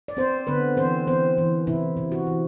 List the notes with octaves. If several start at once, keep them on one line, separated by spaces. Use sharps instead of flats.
D5
C4 C5
D3 B3 B4
E3 C4 C5
E3 C4 C5
E3
C3 E4
C3
F#4
E3